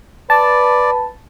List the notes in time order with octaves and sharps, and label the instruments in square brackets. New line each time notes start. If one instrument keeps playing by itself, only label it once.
[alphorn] B4 [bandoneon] D5 [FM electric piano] A5